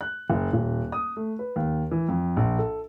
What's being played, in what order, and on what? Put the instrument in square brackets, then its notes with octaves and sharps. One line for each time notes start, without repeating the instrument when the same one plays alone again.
[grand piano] F#6
F#1
D#1
D#6
A3
B4
D#2
E3
F2
A#1
A4